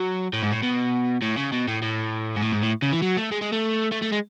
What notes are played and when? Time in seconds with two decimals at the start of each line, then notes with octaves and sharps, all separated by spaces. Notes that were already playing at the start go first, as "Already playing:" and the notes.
Already playing: F#3
0.33 A2
0.42 G#2
0.52 A2
0.63 B2
1.22 A2
1.37 C#3
1.52 B2
1.68 A2
1.82 A2
2.36 G#2
2.42 A2
2.52 G#2
2.63 A2
2.82 C#3
2.92 E3
3.02 F#3
3.17 A3
3.32 G#3
3.42 G#3
3.53 A3
3.92 A3
4.02 A3
4.12 G#3